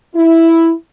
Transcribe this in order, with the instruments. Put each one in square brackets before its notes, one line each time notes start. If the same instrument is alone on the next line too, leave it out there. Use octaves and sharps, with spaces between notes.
[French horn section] E4